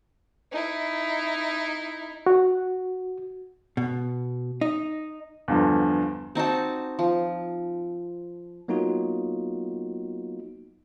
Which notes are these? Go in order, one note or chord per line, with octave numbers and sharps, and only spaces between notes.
D#4 E4
F#4
B2
D#4
E2 G2 D3 F3
C4 D#4 F#4 A5
F3
F#3 A#3 B3 D#4 F4 F#4